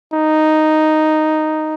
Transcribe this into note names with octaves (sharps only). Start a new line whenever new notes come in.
D#4